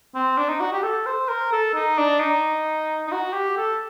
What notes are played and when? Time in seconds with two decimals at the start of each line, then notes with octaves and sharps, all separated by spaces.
0.15 C4
0.38 D4
0.49 D#4
0.60 F#4
0.73 G4
0.83 A4
1.06 C5
1.29 A#4
1.52 A4
1.75 D#4
1.98 D4
2.20 D#4
3.07 D#4
3.12 F#4
3.33 G4
3.57 A4